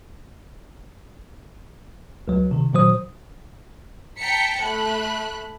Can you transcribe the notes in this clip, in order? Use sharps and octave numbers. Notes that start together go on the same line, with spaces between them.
C#2 F#3
C3 D#3
A#2 D#3 F#3 C5 D#6
G5 A5 A#5 B6 C#7
A3 B5 F#6